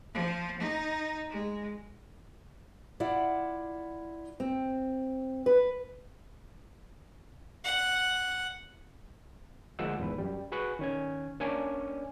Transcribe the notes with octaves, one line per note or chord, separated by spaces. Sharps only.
F3
D#4
G#3
E4 F4 D5 F#5
C4
B4
F#5
D2 F3 G#3 A#3 F#5 E6
E2 G#2 B4
F#2 G3
F#4 G#4 B4 C#6 F#6
D#3 C#4 G#6
A#3 C#4 D4 C#5 D5 G#5